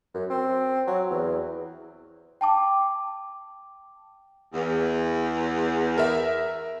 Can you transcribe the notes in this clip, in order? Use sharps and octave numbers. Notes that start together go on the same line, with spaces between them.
F#2
C4
F#3
E2
G5 A5 D6
E2
A#4 E5